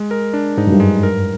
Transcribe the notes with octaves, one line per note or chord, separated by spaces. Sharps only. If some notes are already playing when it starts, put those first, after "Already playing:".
Already playing: G#3
A#4
D4
G#2 D#4
F#2
G2
G#3
A#4